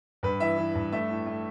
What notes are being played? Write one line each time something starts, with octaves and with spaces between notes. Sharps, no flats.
G2 B4
E3 E5
E3
G2
A3 E5
A2
A3